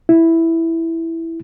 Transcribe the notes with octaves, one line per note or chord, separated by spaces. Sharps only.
E4